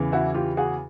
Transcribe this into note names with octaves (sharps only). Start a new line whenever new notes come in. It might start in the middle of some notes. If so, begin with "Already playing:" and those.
Already playing: E2 C#3 E3
E4 F#4
F4 G4
F#4 G#4